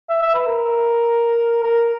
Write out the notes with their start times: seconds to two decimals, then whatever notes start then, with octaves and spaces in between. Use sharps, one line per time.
0.09 E5
0.22 E5
0.34 B4
0.47 A#4
1.63 A#4